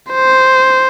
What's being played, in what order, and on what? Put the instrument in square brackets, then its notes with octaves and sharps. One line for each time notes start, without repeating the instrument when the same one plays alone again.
[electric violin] C5